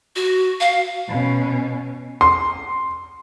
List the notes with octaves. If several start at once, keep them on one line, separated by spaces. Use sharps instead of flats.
F#4
F5
B2 C#4
C6